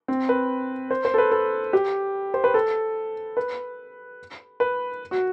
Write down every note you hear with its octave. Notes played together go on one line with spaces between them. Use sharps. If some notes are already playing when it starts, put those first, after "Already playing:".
C4
B4
C5
C5
A4
B4
A4
G4
C5
B4
A4
B4
B4
F#4